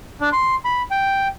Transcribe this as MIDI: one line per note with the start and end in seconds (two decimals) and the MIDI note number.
0.21 0.29 62
0.33 0.55 84
0.65 0.82 83
0.91 1.28 79